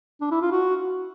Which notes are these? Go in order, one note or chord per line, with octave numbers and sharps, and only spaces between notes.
D4
E4
F4
F#4